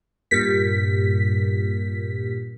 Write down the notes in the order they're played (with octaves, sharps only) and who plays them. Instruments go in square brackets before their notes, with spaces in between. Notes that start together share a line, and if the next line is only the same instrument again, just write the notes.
[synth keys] G2 A#2 B6